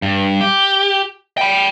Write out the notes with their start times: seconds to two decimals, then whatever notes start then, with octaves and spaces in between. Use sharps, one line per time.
0.02 G2
0.41 G4
1.38 G5 B5